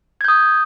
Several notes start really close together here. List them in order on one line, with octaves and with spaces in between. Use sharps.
G#6 G6 D#6